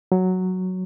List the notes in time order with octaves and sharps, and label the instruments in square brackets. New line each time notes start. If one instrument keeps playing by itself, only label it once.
[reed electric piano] F#3